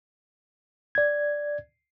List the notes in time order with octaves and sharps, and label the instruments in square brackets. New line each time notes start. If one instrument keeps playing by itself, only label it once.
[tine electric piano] D5 G#6